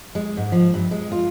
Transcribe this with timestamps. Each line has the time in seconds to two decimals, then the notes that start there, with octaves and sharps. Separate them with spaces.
0.15 G#3
0.37 G#2
0.52 F3
0.74 G2
0.91 G#3
1.12 F4